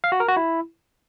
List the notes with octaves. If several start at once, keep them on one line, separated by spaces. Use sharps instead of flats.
F5
F#4
A#4
F#4
E4